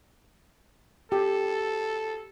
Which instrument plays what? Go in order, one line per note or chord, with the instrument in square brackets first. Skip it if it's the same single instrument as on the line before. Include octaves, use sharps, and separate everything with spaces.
[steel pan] G4 [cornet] A4